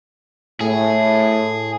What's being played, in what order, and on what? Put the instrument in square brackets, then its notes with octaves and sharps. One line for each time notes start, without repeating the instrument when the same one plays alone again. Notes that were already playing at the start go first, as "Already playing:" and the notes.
[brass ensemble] A2 [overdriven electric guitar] G#4